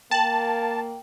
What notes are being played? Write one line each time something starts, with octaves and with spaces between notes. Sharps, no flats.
A#3 G5 A5 F#7